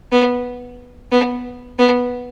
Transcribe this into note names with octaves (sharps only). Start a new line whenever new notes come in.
B3
B3
B3